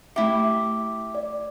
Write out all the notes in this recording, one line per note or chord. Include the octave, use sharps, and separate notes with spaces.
A3 E4 G4 E5
D5